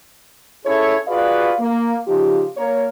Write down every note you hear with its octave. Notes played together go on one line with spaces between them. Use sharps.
C#4 E4 G#4 A4 C#5
F4 F#4 G#4 B4 D5 F5
A#3
C#3 F3 D#4 F4 G4
A#3 A#4 C#5